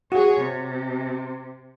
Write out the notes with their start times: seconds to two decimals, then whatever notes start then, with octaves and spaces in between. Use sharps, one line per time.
0.12 F#4 G#4 C#5
0.40 C3